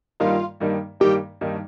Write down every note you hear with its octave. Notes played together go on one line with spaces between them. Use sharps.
G2 D#3 G3 A#3 D#4 F4
G2 D#3 G3 A#3 D#4
G2 D#3 G3 A#3 D#4 G4
G2 D#3 G3 A#3 D#4